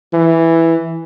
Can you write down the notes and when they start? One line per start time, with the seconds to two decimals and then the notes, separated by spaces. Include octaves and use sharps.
0.13 E3